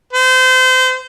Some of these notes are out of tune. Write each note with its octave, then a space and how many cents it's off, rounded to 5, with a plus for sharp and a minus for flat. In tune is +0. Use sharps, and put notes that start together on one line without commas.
C5 -30